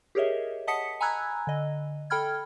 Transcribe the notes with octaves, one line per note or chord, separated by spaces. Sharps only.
G4 G#4 A#4 C#5 D#5 E5
D#5 F#5 A5 D#6 B6 C#7
G#5 A#5 B5 E6 F#6 G#6
D3 D#5
A4 G5 B5 F6 G#6